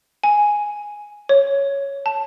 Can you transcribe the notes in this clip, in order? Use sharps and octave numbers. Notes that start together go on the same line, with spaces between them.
G#5
C#5
A5